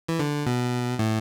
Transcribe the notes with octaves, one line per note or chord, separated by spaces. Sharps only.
E3
D3
B2
A2